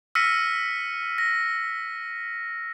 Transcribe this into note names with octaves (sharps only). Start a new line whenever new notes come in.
E6 F6 A#6 B6 C#7 D#7
A#6